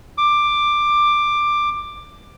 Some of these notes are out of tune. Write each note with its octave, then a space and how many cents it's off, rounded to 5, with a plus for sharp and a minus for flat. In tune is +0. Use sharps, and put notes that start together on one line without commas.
D6 +10